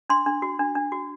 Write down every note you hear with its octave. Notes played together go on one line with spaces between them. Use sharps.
D4 C6
D4
F#4
D4
D4
F#4